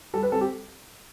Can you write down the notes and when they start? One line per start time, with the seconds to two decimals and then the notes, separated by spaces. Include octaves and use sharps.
0.14 G3 A4
0.23 B4
0.32 C4 A4
0.41 G4